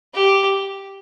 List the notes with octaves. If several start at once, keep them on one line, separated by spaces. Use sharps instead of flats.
G4